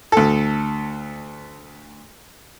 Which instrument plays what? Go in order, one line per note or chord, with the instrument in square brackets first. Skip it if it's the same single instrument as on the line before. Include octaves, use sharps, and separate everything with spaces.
[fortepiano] D2 A4